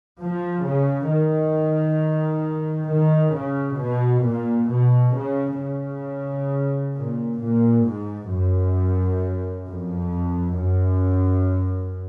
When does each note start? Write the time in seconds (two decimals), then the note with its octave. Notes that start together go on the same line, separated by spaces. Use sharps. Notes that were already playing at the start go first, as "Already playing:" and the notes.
0.20 F3
0.64 C#3
1.09 D#3
2.90 D#3
3.34 C#3
3.80 B2
4.24 A#2
4.70 B2
5.15 C#3
5.60 C#3
6.96 A#2
7.41 A#2
7.86 G#2
8.30 F#2
9.66 F2
10.57 F#2